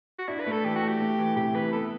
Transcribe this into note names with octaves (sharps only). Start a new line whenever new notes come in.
F#4
D4 E4
B4
A3
A4
E3 G4
F#4
A3
G4
A3
E3
C3 G4
E3 B4
B3 A4